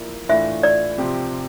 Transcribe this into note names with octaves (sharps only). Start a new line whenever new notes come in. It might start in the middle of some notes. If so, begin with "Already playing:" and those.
Already playing: F3 A#3 E4 D5
A2 E3 A3 D4 F4 E5
D5
C3 F3 C4 G4